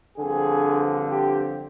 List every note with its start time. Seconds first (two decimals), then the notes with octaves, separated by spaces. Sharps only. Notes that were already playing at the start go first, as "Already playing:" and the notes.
0.17 G2 D3 F3 C4 G#4
1.10 G4